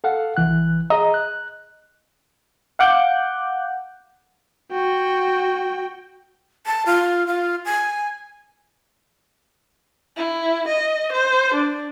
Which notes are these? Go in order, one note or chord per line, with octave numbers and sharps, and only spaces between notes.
A4 F5 F#5
C2 E3 F#6
G#4 D#5 A#5
F#6
F5 F#5 D6 F#6 G6
F#4 G5
A5
F4
F4
G#5
E4
D#5
C5
D4